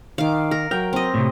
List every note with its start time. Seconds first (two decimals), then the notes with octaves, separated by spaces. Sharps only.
0.18 D#3 F5 D6
0.51 A#4
0.71 F#3 A#4 G5
0.93 C4 D#5
1.14 A2 C3